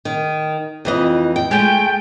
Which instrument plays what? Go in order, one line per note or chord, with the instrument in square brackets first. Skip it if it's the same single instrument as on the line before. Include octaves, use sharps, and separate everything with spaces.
[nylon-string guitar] D#3
F2 E3 D#5
G5
[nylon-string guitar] G#3 A3 [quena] G5